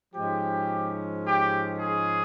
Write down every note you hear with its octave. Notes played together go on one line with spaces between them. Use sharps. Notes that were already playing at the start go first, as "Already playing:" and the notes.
G#2 F3 G#3 C#4 G4
G4
G#4